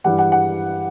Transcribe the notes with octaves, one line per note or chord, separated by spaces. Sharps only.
G2 E3 G3 F#5
F#5
F#5